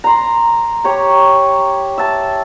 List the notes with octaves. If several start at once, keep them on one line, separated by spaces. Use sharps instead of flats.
A#5 C6
G4 C#5 A#5
E5 A5